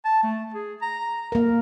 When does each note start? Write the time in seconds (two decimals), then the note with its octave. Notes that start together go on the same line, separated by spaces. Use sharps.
0.05 A5
0.23 A3
0.54 G#4
0.82 A#5
1.32 A#3 A#4